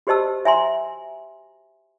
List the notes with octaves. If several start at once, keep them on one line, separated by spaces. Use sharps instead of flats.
F#4 G4 C5 D#5 A5 E6
E5 G#5 A#5 C6